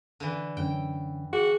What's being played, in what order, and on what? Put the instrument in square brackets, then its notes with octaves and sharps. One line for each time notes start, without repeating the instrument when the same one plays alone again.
[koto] D3 E3
[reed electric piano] F#2 D3 C#4 [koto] G5
[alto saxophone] F#4 [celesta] G#4